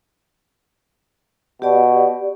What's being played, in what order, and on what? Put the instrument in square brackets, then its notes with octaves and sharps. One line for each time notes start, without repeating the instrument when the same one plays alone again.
[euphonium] B2 [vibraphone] G4 D5